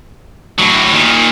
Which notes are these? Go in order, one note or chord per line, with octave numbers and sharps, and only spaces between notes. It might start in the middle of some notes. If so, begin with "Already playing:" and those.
A2 F#3
A#2 D#3